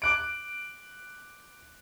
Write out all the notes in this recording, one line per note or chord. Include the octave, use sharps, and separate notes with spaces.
D6 F#6 D7